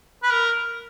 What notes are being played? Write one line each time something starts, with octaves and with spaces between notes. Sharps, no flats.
B4
A#4